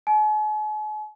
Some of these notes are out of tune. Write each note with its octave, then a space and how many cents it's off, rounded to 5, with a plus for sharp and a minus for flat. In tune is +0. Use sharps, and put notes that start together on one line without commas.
G#5 +45